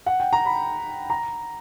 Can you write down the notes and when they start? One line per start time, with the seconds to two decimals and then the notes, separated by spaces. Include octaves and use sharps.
0.06 F#5
0.20 G5
0.33 A#5
0.45 B5
1.10 A#5